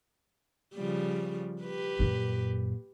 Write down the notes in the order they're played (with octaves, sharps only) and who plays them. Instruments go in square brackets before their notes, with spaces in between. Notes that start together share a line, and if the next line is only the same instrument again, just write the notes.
[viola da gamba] C#3 F3 G3
G4 B4
[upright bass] F#2 A#2